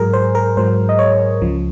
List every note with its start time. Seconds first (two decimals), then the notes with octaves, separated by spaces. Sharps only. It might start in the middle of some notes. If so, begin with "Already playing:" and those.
Already playing: G#2 F#3 G#4 A#4
0.13 C5
0.35 A#4
0.57 G#2 F#3 C5
0.89 D#5
0.99 C#5
1.41 C#2 C#3 F3